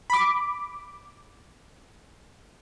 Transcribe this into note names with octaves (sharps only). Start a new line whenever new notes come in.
B5 D6